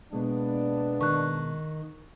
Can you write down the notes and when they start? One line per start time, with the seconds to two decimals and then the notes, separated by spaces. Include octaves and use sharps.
0.13 B2 G#3 A#3 B3 D4
1.01 D#3 C#6 F#6